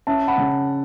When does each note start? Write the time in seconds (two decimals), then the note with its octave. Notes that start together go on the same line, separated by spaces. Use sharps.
0.07 C#4 E5 A5
0.28 F#5 B5
0.38 C#3